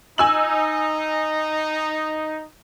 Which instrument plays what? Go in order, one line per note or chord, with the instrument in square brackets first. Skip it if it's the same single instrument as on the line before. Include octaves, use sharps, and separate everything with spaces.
[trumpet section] D#4 [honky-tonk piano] G#5 E6 F#7